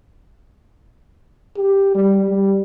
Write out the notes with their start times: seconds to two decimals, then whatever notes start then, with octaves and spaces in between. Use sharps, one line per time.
1.57 G4
1.95 G3
2.29 G3